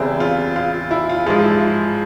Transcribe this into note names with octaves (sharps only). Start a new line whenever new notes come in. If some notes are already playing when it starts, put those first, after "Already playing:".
Already playing: E2 C#3 G3 C4 C5 E5
F4
F4
E4
F4
G#2 F3 G#3 F4
E4